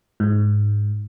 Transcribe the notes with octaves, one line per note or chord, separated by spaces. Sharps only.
G#2